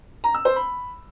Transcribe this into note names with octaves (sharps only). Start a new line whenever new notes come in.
A#5
E6
C5
B5